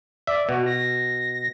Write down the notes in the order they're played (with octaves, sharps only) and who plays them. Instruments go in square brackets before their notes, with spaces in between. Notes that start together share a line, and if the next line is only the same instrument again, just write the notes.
[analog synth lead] D5 [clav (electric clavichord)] E5
[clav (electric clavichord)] B2 [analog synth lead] F#4
[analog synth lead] A#6